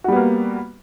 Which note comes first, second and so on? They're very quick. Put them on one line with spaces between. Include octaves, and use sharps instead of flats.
F#4 G3 B3 A#3